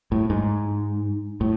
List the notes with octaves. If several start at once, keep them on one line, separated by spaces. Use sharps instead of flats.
A2
G#2
A2